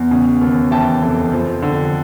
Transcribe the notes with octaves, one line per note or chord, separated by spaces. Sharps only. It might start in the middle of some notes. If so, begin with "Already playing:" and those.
Already playing: E2
C#3
D#2
E3 G5 A5
F1
F3
D3